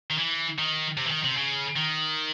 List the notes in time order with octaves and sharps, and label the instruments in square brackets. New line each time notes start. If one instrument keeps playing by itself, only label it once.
[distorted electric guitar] D#3
E3
D#3
C3
E3
D#3
C3
C#3
D#3